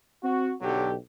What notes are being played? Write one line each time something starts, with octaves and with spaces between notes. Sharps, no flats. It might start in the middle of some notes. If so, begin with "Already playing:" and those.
C4 F#4
B1 D3 F#3 G4